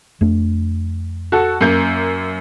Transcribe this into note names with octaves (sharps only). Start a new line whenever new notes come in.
F2 A3 D4
F#4 A4
F#2 A#3 G6